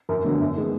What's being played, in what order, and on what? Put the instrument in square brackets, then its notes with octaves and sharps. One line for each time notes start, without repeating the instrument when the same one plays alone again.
[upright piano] F#2 A#4
D3 F#3 B3
F#2
D#3 G#3 B3